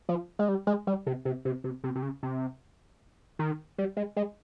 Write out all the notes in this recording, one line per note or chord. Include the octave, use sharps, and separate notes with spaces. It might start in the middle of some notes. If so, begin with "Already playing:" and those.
F3
G#3
G3
G#3
G3
C3
C3
C3
C3
C3
C3
C#3
C3
D#3
G3
G#3
G#3